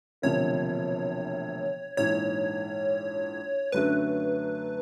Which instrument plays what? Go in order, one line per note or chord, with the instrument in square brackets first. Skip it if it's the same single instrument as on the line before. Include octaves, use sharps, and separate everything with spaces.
[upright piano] E1 D2 C3 F3 A#3 [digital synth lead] C#5
[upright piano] A#1 G#2 E3 [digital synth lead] C#5
[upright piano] F#2 D3 F#3 A3 D4 [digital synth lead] B4